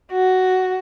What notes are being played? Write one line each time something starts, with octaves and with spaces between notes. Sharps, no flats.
F#4